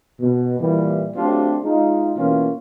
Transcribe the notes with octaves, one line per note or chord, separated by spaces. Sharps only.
B2
A#2 E3 G3
F#3 A3 C4 D4 F4 G4
G#3 D#4 F4
B2 E3 A#3 C#4 F4